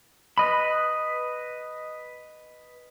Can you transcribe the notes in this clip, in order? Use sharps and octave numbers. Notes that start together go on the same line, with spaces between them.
B4 D#5 B5